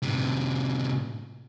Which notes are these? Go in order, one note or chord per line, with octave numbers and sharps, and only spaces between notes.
A2 C3